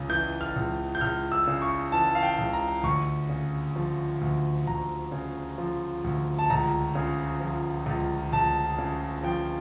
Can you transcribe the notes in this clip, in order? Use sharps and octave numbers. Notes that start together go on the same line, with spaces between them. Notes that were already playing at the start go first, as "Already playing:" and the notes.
Already playing: C#2 C#3
E3 G6
F6
C#2
G6
C#2 F6
E6
C#3
C#6
E3 A5
F5
G5
C#2
A#5
D2 C#6
C#3
F3
D2
D2 A#5
C#3
F3
D2
A5
C#2 A#5
C#3
F3
C#2
C#2 A5
C#3
F3 G5